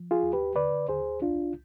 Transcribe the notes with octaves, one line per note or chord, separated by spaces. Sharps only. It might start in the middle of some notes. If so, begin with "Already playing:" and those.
Already playing: F3
F4 G#4
D#2
G4 B4
D3 B4 D5
D#2 G#4 C5
C2 D4 F4